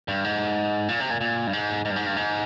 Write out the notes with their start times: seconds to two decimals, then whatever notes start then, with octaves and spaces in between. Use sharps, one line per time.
0.08 G2
0.25 G#2
0.89 A#2
1.00 C3
1.10 A#2
1.21 A#2
1.47 G2
1.53 G#2
1.85 G#2
1.90 G2
1.96 G#2
2.06 G2
2.17 G#2